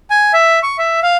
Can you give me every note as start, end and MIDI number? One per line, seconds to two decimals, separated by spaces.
0.10 0.32 80
0.33 0.59 76
0.63 0.77 85
0.78 1.00 76
1.03 1.17 77